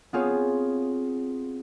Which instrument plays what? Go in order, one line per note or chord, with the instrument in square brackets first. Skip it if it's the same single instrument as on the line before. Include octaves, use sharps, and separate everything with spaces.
[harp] B3 C4 F4 G#4 C#5